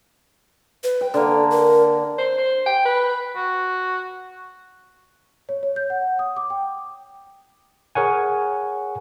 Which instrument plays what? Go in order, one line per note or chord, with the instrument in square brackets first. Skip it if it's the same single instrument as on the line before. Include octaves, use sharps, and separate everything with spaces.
[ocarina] B4
[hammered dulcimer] G5
[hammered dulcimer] D3 A#3 [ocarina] A4
[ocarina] A#4
[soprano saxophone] C5
C5
G5
B4
[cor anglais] F#4
[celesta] C#5
C#5
G6
F#5
D#6
D6
G5
[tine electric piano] G#4 A#4 C#5 F#5 G#5